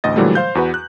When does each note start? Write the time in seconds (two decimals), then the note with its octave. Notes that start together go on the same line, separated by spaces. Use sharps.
0.04 A1 D2 D#5 A6
0.16 A#2 D3 E3 F#3 G3 A3
0.35 C5 F5 G6
0.55 E2 F#4 B4
0.74 F#6